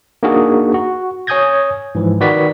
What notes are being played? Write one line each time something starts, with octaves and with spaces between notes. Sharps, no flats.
A#3 D4 D#4 F#4 G#4 A#4
F#4
C#5 G#5 D#6 G6 G#6 A#6
G#2 E3 F3
D#3 F#4 B4 D5 B6